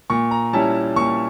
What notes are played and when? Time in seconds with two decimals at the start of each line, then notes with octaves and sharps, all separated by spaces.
0.10 A#2 C#6
0.31 A#5
0.53 G3 C#4 E4 A5
0.96 A#2 C#6